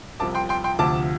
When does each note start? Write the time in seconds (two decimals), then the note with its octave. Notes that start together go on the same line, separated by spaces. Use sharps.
0.20 C2 C3 F3 A5 D6
0.35 G5 C6
0.49 G5 C6
0.64 G5 C6
0.79 D2 C3 F3 A5 D6